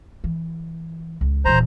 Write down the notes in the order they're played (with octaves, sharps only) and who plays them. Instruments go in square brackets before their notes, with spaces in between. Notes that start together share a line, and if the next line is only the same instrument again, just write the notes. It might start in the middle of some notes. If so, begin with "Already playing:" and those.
[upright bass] E3
C#2
[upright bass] D#1 E3 [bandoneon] C5 A#5